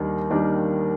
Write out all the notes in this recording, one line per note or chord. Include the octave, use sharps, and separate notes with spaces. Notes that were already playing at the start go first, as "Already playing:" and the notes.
Already playing: D#2 D#3 G3 A#3 D4
D#3 G3 A#3 D4